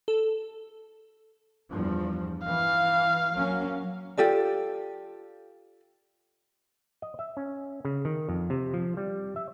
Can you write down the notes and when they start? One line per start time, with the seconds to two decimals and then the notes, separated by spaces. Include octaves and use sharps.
0.08 A4
1.70 E2 G2 F3
2.45 E3 F5
3.32 F#3 A#3 C#4
4.17 F4 G4 A4 D5
7.02 D#5
7.19 E5
7.37 C#4
7.85 C#3
8.05 D#3
8.29 F2
8.50 C3
8.74 F3
8.97 G3
9.36 E5